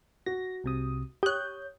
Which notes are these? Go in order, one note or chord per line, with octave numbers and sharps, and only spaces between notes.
F#4 A#6
C2 C3 D#6
G4 C#5 D#6 F#6 G6